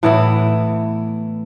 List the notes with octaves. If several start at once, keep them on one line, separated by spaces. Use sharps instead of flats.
A2 E3 B3 E4